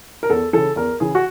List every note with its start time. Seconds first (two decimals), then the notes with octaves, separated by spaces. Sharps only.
0.23 A#4
0.30 E2 A4
0.53 C#3 E3 A4
0.76 E2 A#4
1.00 C#3 E3 G#4
1.15 F#4